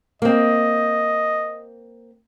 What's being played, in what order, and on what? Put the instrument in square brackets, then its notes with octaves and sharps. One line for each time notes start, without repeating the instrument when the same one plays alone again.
[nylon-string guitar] A#3 C4 [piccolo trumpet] D#5